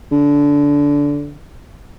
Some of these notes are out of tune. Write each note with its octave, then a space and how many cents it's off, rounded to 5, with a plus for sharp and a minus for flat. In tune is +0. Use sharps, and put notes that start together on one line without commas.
D3 -20